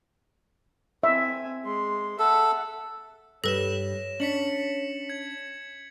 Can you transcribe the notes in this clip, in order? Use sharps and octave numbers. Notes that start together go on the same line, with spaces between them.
C4 E5 G#5
G#3 C6
A4 E5 F#5
G2 G3 A4 B4 C#5 A#6 E7
C#4 D4 B6 C#7 F#7
G#6